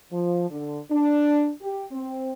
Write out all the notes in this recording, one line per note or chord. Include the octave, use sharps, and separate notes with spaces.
F3
D3
D4
G4
C4